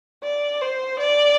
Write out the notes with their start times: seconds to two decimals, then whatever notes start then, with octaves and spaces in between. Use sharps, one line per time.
0.23 D5
0.62 C5
0.99 D5